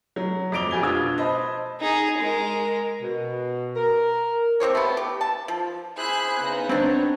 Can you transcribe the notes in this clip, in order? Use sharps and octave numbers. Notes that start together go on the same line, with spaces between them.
F#3
F2 D5 D6 D7 F7 G7
F2 F#4 G4 G#5 G#6 G7
B2 D4 F4 D#6 E6 G#6
C5 D#5 A5 B5
D#4 G#4
G#3 A#4
B2
A#4
C4 G4 C5 C#5
A3 B3
G4
A5
F3
E4 G#4 C5 G#5 B5 F#6
C#3 B3 D#4
C4 D4 C#5